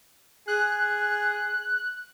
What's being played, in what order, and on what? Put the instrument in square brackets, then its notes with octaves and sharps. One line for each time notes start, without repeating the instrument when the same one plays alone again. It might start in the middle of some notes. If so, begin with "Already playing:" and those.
[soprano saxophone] G#4 [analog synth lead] F#6